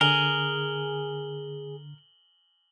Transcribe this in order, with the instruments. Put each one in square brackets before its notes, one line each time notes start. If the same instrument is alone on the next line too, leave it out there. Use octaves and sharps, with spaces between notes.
[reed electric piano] D3 [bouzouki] G#4 [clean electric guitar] A#4 [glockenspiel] F#7 G7